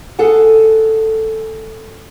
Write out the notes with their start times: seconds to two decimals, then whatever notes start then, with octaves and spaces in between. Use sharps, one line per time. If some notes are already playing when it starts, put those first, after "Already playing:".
0.19 G#4 A4 F#5 G#5